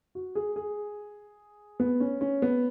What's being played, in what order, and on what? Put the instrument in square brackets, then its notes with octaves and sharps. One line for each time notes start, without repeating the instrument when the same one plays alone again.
[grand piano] F#4
G#4
G#4
B3
C#4
C#4
B3